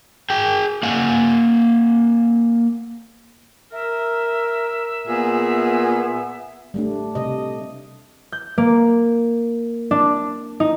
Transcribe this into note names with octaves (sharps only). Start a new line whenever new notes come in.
G#4 G5
A#3 F5 F#5 G#5
A#4 E5
A#2 B3 G#4
G3 A3 D4
C3 D#5
G6
A#3
D4
D#4